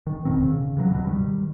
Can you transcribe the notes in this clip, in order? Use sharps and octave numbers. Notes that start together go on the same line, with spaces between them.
D#3
E1 B2 D#3 C4
C#3
C#3 E3 F#3
C#2 G2 B2 F#3
D#3 G3